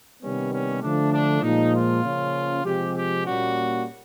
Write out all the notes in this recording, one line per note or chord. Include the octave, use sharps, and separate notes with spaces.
C3 D#3 G3 B3 C#4
C#4
D3 F3 A3 D4
D4
A#2 F3 G#3 D#4
F4
C#3 F3 A#3 C#4
C3 F3 G#3 C4 G4
G4
A#2 G3 A#3 C#4 F#4